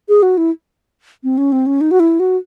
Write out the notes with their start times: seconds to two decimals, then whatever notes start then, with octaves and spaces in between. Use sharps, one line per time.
0.09 G#4
0.23 F#4
0.37 E4
1.24 C4
1.38 C#4
1.52 C4
1.66 C#4
1.81 D#4
1.91 F#4
2.00 E4
2.20 F#4